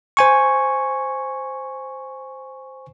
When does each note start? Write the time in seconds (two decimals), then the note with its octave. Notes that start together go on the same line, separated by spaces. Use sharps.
0.17 C5 G#5 C#6